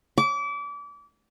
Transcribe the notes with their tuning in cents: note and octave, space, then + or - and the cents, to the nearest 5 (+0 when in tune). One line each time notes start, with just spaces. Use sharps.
D6 -30